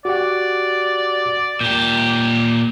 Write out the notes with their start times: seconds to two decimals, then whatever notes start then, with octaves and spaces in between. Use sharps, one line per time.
0.05 F#4 G4 D5 F#5
1.61 A#2 G4 G6